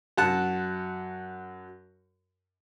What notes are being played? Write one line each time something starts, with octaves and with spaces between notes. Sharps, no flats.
F#2 F#5 A5 F#6